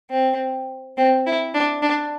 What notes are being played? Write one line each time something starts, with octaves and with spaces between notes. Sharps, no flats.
C4
C4
E4
D4
D4